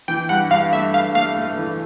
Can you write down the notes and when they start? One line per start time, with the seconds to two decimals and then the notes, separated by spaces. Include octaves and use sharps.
0.08 E3 G5
0.29 G2 F#5
0.50 G2 F5
0.72 A3 E5
0.94 G2 F5
1.15 A3 F5
1.37 A3
1.57 E3